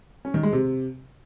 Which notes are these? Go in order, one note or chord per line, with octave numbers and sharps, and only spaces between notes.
C#4
D#3
G#3
C3